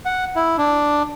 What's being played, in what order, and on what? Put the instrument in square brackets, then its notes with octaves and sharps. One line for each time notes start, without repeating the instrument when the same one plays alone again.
[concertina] F#5
E4
D4